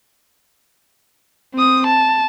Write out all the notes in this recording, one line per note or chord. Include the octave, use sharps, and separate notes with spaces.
C4 D#6
A5